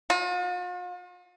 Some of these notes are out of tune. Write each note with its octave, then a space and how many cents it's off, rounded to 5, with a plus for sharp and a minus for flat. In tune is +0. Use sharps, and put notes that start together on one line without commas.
F4 +45